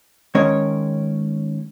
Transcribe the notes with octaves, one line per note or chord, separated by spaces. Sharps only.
D#3 G#3 C#4 A#4 C#5